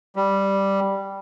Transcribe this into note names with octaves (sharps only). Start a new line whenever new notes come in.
G3